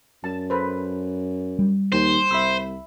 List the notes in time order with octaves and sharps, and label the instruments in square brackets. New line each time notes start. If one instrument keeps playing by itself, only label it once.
[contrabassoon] F#2 [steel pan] A5
[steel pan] A4 B4 C5
[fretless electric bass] G3
[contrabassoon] D#2 [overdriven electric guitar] C5
[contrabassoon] C2 [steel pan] E5 B5 E6